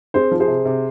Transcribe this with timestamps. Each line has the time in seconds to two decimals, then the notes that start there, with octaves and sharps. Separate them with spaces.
0.14 C4 G#4 C5
0.31 F3
0.40 G#4 C5
0.48 C3
0.65 C3